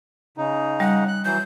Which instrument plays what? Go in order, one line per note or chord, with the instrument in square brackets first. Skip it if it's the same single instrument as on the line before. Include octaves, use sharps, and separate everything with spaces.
[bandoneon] C#3 D#4
[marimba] G3 [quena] F#5
[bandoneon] F#6
[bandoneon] E3 F#3 [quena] G6